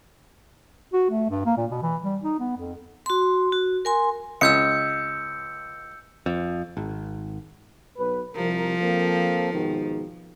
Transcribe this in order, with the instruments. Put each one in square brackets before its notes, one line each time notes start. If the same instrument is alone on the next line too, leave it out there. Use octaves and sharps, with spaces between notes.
[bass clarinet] F#4
A3
G2
A#3
A#2
B2
E3
G3
D#4
B3
F2
[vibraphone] F#4 C6
F#4
A#4 G#5 C6
[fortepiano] C#2 [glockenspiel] E6 G6 C#7
[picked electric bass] F2
G#1
[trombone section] B1 F#3 B4
[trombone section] C2 C3 A#4 [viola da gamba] F3
[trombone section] A#3 C4 A4
G#2 B2 D#3